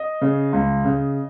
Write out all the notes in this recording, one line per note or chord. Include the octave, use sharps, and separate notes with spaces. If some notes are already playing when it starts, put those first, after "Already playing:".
Already playing: D#5
C#3
C#2
C#3